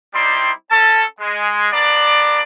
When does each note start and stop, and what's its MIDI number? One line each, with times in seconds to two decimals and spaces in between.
0.14 0.52 55
0.14 0.52 60
0.14 0.52 63
0.14 0.52 64
0.14 0.52 74
0.14 0.52 84
0.70 1.03 61
0.70 1.03 69
0.70 1.03 81
1.20 1.70 56
1.72 2.42 59
1.72 2.42 62
1.72 2.42 70
1.72 2.42 74